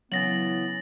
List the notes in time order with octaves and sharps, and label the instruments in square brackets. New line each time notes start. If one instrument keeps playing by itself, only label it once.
[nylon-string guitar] C#3 E3 [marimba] F#3 [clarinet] B3 [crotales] A6 A#6 F#7